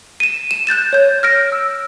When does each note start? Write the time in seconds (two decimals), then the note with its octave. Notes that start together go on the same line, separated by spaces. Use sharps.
0.20 D#7 E7
0.51 E7
0.67 F#6 G6 A6 E7
0.93 C#5 G6
1.23 F6 A#6 D7
1.52 E6